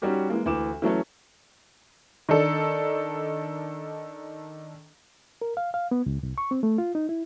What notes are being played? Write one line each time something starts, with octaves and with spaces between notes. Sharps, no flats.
G3 C#4 D#4 F#4 G4
E3 G#3 A#3
D2 E3 D6 E7
E3 F#3 A3 C#4
D#3 D4 A4
A#4
F5
F5
B3
C#2
C2
C#6
C4
A3
F4
D#4
E4